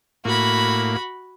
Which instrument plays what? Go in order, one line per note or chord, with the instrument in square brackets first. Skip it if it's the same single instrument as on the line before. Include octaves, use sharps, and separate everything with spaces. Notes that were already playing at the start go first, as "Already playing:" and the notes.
[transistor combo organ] A2 A#3 [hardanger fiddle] F#4 B5